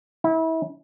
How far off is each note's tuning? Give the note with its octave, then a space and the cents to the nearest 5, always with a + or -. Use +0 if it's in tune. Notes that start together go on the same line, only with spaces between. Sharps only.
E4 -30